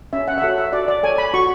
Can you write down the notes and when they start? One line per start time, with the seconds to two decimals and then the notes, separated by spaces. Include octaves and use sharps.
0.13 C#4 E5
0.28 F#5
0.38 E5
0.42 F#4 A4 C#5 F#5
0.58 E5
0.73 F#4 D5
0.88 D5
1.03 A4 C#5 G#5
1.18 B5
1.34 F#4 C#6